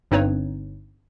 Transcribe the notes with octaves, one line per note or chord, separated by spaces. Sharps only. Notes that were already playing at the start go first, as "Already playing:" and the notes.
G1 G2 C4 D#4 B4 C#5